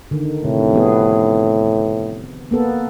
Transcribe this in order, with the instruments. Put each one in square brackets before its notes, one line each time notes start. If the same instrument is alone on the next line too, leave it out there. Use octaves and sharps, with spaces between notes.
[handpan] D3 D#3
[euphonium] A2 [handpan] C3
[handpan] F3 B3 G#4
A#3 B3 A4